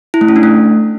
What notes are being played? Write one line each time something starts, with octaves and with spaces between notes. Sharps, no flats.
E4
A3
C#4
D4
A3